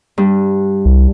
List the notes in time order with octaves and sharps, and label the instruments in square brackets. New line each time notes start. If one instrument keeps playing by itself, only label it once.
[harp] G2
[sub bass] C2